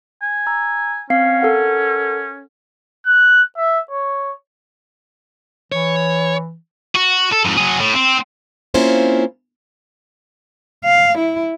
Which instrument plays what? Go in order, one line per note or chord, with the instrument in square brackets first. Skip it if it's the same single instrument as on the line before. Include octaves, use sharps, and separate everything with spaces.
[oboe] G#5
[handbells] A#5 E6
[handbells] C4 F5 C7 [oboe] C#4
[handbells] A4 A#4 F#5
[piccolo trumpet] F#6
E5
C#5
[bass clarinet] E3 [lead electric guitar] C#5
[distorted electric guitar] F#4
A4
F2 G#2
F#3 G#4
A2
C4
[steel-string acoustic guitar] A#3 C4 C#4 E4 F4 C5
[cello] F5
E4